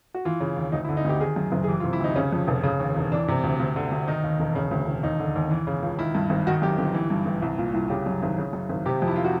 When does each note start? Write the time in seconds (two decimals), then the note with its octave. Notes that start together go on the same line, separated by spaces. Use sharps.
0.14 F#4
0.25 E3 F4
0.40 C#3
0.57 D#2
0.72 D2 D#4
0.85 E4
0.89 D3
0.97 D#4
1.05 D2 G4
1.20 D#3 G#4
1.36 F#2
1.52 F#1
1.64 G#4
1.68 E3 G4
1.80 F4
1.84 C3
1.93 E4
2.00 D2 D#4
2.16 C#3 C#4
2.32 F2
2.48 F1
2.63 C#3
2.80 D#2
2.96 E1
3.12 E3 D4
3.28 C3
3.44 D2
3.60 D2
3.76 D3
3.92 D2
4.08 D#3 D#4
4.23 D#2
4.39 E1
4.55 C#3
4.71 D2
4.87 E1
5.03 D#2 D#4
5.19 D3
5.36 D#2
5.51 E3
5.67 C#3
5.83 C#2
5.99 D#3 E4
6.15 G2
6.30 G#1
6.47 D#3 F#4
6.62 F#2 G4
6.78 G1 G4
6.94 E3
7.10 G2
7.26 A1
7.42 C2
7.58 A#2
7.74 C2
7.90 C#3 G4
8.06 F#2
8.22 G#1
8.38 C#3
8.53 F#2
8.69 G#1
8.86 C3 G4
9.02 F2
9.07 E4
9.16 F4
9.25 F#4